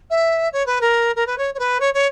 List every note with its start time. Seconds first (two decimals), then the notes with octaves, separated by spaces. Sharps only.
0.10 E5
0.52 C#5
0.66 B4
0.81 A#4
1.15 A#4
1.26 B4
1.38 C#5
1.54 C#5
1.59 B4
1.80 C#5
1.94 C#5